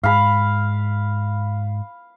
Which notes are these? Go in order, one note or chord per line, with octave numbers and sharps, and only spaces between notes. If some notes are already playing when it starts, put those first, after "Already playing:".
G#2 F5 B5